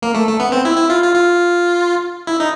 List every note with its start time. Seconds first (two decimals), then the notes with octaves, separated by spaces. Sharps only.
0.02 A#3
0.14 A3
0.27 A3
0.40 B3
0.52 C4
0.65 E4
0.77 E4
0.90 F4
1.03 F4
1.15 F4
2.27 E4
2.40 D#4